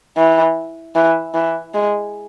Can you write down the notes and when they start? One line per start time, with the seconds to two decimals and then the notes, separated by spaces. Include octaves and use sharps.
0.17 E3
0.95 E3
1.34 E3
1.74 G#3